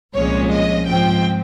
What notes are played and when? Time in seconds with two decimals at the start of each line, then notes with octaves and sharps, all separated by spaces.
0.13 C2 A#2 F3 G#3 C#4 C#5
0.50 D#5
0.87 G#2 F3 C4 G5